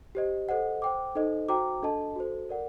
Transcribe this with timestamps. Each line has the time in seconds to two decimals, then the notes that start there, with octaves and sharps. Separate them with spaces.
0.15 G4 C5 D#5
0.49 A4 C5 D#5 F#5
0.82 C5 G5 D6
1.15 D#4 A4 C5 D#5
1.49 F#4 C5 G5 A#5 D6
1.83 D4 A4 D#5 A5
2.16 F#4 A4 C5
2.49 A#4 D5 F#5